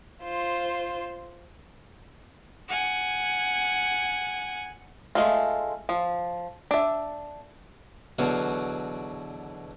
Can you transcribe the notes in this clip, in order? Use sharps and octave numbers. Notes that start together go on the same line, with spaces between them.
F4 C5
F#5 G#5
G#3 A3 F4
F3
D4 E5
E2 B2 D3 F#3 F#4